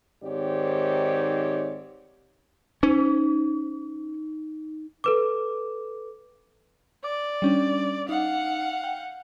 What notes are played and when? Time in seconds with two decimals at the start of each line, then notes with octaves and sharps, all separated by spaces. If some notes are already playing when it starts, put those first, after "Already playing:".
0.24 G#2 D#3 C4 G4 C#5 D5
2.83 C#4 D#4
5.04 A4 B4 D6
7.04 D5 D6
7.42 G3 C#4 D4
8.09 D#4 F5 F#5
8.84 G5